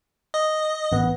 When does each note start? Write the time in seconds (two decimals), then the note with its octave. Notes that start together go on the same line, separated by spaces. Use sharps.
0.34 D#5
0.92 A1 B3